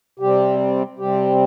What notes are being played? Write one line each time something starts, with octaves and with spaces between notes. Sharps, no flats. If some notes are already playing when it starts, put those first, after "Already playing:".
C3 G3 C4 G4
C3 G3 C4 G4